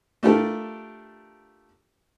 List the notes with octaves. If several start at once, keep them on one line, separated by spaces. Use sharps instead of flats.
A3 D4 F4 G4 A4 A#4